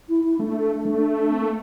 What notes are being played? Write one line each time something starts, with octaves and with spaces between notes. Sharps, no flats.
E4
E4
A3 D4
A3
C4
A#3